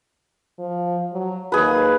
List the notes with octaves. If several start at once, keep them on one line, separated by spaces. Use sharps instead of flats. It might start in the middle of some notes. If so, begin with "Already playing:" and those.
F3
F#3
D#2 G#4 B4